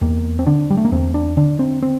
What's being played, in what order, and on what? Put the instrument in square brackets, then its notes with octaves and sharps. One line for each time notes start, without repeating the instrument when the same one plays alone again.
[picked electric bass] E2 A#3
C4
D3 D4
G3
A3
A#3
E2 C4
D4
D3 D4
C4
C4